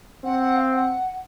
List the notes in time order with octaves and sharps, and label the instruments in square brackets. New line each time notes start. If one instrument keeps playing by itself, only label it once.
[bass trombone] C4 [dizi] F#5
[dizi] F#5
F5
F#5